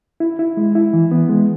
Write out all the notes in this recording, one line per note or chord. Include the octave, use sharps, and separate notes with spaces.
E4
E4
G#3
E4
E3
B3
G#3